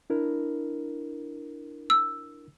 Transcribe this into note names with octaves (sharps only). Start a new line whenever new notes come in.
D4 E4 A#4
E6